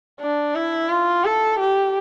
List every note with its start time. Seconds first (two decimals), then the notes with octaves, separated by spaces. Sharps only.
0.21 D4
0.55 E4
0.90 F4
1.25 A4
1.59 G4